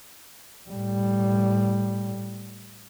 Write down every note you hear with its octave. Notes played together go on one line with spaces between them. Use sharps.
A2 G3